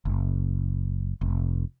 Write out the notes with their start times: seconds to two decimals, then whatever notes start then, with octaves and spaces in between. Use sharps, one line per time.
0.05 F#1
1.21 F1